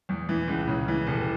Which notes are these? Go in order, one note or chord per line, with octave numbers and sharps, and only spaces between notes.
E2
E3
C#2
C#3
E3
F1